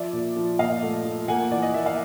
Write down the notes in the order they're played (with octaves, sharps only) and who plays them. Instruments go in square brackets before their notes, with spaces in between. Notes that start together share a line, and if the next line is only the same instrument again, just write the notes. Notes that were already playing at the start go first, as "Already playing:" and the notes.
Already playing: [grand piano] F3 D5 E5
A#2
F3
A#2 D#5 F5
A3
F3
A#3 F#5 G#5
E3 D5
D#5
A#3 E5
F5